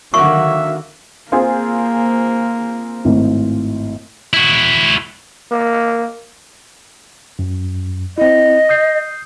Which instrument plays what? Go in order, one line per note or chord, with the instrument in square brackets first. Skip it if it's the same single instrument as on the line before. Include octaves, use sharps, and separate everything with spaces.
[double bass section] D3 D#3 F#3 [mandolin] A#3 F#4 [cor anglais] E5 [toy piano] C#6
[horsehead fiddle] A#3 [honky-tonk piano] C4 F4 G#4
[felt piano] G#1 A2
[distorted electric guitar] E4 F#4
[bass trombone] A#3
[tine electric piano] F#2
[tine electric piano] C4 E4 [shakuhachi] D#5
[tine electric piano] D#6 G6 C7